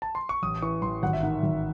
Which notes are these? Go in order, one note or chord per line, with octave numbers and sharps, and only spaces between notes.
A5
C6
C#6
A1 D#6
E3 C#6
A1 C6
G#1 F#5
E5
D#3 F#5
G#1